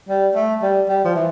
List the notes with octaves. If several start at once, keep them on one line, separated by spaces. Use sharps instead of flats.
G3
A3
G3
G3
F3
E3